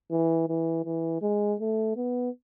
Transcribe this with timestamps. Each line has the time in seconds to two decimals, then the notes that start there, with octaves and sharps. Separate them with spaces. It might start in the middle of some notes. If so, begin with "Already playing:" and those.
0.11 E3
0.49 E3
0.85 E3
1.22 G#3
1.60 A3
1.96 B3